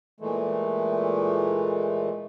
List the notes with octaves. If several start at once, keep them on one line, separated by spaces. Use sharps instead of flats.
A#2 E3 G#3 A3